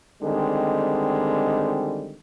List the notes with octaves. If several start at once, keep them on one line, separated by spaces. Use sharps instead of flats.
D3 D#3 G3 G#3 C4